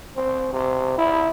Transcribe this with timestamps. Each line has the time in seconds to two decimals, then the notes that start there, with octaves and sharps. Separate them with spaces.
0.16 C4
0.53 C3
0.98 E4